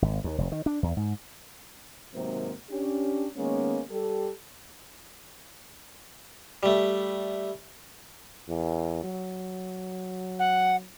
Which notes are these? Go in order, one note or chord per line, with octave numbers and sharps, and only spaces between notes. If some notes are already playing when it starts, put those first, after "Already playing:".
G#1
D#2
F1
D#3
D4
E2
G#2
G#2 C3 D#3 F#3 A#3 C4
C#4 D4 G4
D#3 G#3 A#3 B3 C#4
G3 G4 A4
G3 A3
E2
F#3
F#5